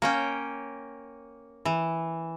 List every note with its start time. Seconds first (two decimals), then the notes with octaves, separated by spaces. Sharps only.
0.02 A#3 C#4 G5
1.65 E3